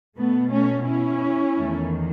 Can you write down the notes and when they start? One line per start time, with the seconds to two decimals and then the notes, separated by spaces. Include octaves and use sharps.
0.17 B2 A3 B3
0.51 A3 C#4
0.86 C#4 E4
1.57 E2 D#3 A3